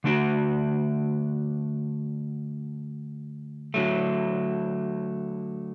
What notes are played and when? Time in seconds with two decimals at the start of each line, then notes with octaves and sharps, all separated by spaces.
0.04 D3 A3 D4 F#4
3.74 D3 F#3 A3